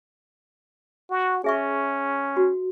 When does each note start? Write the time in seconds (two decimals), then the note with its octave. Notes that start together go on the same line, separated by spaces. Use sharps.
1.10 F#4
1.44 C#4 G#4 E5 C#6
2.37 F#4